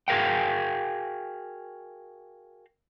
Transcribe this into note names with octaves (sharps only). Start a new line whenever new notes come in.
F#4 G#4 A#4 F5 G5